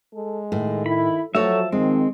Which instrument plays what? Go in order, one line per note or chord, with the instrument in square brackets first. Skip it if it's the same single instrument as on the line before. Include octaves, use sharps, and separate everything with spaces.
[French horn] G#3 [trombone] A4
[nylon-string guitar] A2 [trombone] D#3
[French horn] E4 [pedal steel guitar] B5
[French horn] F3 [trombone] F#3 [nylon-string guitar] A3 F#4 C#5 [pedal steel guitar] E5 A5
[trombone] D#3 [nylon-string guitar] G#3 [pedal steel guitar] C4